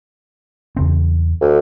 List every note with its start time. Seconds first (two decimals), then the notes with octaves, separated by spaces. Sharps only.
0.77 E2 C#3 C4
1.41 D2